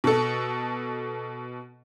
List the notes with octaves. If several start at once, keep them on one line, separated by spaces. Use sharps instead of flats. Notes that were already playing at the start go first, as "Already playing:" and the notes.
B2 A4